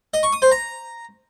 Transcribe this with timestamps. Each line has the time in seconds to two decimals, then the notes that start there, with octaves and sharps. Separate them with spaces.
0.14 D#5
0.23 C#6
0.33 D#6
0.42 C5
0.52 A#5